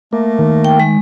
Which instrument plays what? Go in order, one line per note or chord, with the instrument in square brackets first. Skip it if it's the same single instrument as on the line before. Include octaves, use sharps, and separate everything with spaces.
[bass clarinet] A3 [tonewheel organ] A#3
[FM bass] D#3
[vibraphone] G5
G#3